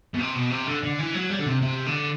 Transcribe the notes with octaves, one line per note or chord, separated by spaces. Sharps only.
B2
C3
B2
C3
D3
D3
E3
F#3
G3
D3
C3
C3
D3